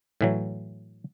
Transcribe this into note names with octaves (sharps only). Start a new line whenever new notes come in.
A2 E3 F#3